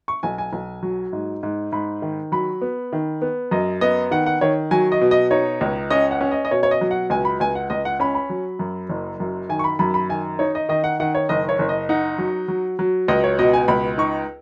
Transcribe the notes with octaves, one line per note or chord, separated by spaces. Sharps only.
C#6
B1 G#5
G#5
B1
F#3
G#2
G#2
G#2 B5
D#3
F#3 B5
B3
D#3
B3
F#2 D#5
B3 D#5
D#3 F#5
F#5
D#3 C#5
F#3 G#5
D#5
B2
D#5
D#4 C#5
C#2
C#4 D#5
F#5
C#4
D#5
D#5
B2 C#5
C#5
D#5
F#3
F#5
C#2 G#5
B5
C#2 G#5
F#5
C#2 D#5
F#5
C#4 B5
B5
F#3
F#2
F#1
F#2
D#3 G#5
C#6
B5
F#2 B5
B5
D#3 G#5
D#4 C#5
D#5
D#3 D#5
F#5
D#3 F#5
C#5
F#1 D#5
C#5
F#1
D#5
D#4 F#5
F#3
F#3
F#3
C#2 D#5
C#5
B2 D#5
G#5
C#2 B5
D#4 C#6